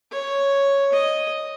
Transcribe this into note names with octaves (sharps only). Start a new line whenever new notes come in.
C#5
D#5